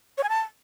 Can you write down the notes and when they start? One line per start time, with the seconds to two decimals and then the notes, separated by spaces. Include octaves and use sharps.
0.18 C#5
0.23 G#5
0.29 A5